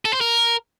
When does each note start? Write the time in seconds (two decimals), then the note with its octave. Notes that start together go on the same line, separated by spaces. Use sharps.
0.05 A4
0.13 C5
0.21 A#4